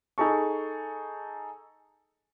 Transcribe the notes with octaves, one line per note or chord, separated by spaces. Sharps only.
D#4 G#4 A4 A5 C#6